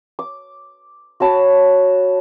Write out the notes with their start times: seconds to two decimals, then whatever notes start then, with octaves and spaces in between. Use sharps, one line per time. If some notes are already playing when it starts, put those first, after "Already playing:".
0.19 D6
1.20 F#4 C#5 A5 B5